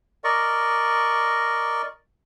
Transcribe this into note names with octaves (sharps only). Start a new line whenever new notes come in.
A#4 D5 D#5 C#6